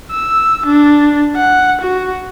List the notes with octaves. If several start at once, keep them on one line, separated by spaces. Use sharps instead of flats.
E6
D4
F#5
F#4